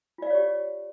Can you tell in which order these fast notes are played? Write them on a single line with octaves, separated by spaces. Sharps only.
F4 D5 F5 C#5 G4